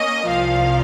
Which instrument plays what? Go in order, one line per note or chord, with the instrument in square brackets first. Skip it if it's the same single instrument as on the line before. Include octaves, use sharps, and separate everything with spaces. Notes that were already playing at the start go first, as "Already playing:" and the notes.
Already playing: [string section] A#3 C#4 D#5
C2 A#2 F3 F5